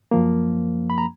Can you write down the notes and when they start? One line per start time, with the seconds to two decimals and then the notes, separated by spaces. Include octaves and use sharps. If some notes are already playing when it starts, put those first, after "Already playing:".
0.11 F#2 F3 A#3
0.90 B5
0.98 A#5